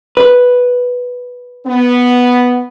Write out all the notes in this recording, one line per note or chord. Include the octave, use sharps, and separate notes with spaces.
B4
B3